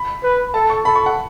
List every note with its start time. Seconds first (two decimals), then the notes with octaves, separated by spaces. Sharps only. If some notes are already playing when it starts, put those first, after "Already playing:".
Already playing: B5
0.23 B4
0.54 A4 A5
0.70 C#6
0.85 A4 B5
0.96 C#6
1.06 F#5